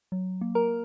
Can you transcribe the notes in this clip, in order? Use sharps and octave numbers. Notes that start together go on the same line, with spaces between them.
F#3
A#3
A#4 A#5